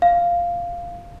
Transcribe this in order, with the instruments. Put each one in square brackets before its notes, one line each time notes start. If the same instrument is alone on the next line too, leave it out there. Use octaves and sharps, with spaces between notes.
[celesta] F5